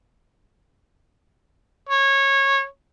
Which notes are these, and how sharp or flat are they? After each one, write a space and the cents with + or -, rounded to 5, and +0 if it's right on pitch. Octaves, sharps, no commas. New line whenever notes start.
C#5 -20